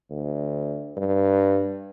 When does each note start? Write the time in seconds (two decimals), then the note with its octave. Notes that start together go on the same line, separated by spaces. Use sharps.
0.10 D2
0.97 G2